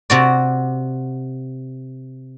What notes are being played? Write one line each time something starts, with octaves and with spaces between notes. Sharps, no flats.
C3 F#4 D5